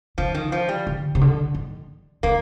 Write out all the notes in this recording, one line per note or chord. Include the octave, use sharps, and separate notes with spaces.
D3 F3
D#3
F3
G3
D3
C3
D3
D#3
D#3 A#3